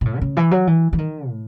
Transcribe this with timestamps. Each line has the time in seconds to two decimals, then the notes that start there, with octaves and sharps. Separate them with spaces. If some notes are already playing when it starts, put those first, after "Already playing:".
0.01 B2
0.05 A2
0.17 D#3
0.21 C#3
0.37 E3
0.51 F#3
0.67 E3
0.93 E3
0.98 D#3
1.29 A2